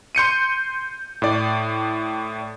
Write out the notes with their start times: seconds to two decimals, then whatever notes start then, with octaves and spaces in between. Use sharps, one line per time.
0.15 C6 G6 C#7 D#7
1.22 A2 D5